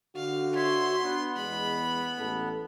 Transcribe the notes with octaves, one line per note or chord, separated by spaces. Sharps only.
D3 F#4 F5
C#5 E5 C6
B3 D4
E2 G#3 B5
A1 A4